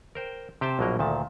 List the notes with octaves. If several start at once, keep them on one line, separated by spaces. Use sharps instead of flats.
A#4 C5 G5
C3 G4 C5 G5 A5
A#1 B2 F#3 A#3 A#4 D#5
D2 A#2 D#3 A5